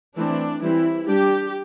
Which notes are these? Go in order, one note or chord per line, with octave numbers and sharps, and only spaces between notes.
E3 A3 C4 D4
E3 G3 C4 E4
G3 D4 G4